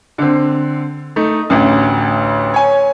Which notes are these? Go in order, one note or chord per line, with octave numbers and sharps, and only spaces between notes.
D3 C4
A3 D#4
A1 D2
C#5 G#5